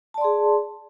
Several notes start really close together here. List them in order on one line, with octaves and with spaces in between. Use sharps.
A5 D5 C6 G#4